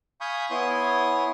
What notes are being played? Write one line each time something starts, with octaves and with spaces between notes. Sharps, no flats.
F5 G#5 B5 C#6 D#6 G6
B3 E4 C#5 G#5 C6 D#6